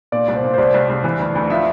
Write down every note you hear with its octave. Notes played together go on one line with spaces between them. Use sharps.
A#2 D5
C2
C5
A#2
C5
C2 D5
C2
C2
E3
D2
D2
F3 E5